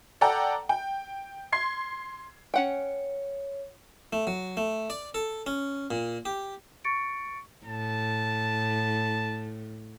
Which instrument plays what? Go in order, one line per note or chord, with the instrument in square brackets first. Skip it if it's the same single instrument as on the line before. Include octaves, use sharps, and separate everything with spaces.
[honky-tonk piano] A4 D5 F#5 G5 A#5
G5
C6 G#6 C7
[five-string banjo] C#4 F#5 G5 [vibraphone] C#5
[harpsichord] A3
F#3
A3
D5
A4
C#4
A#2
G4
[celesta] C#6 A6 C#7 D7
[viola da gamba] A2 [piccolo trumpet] A5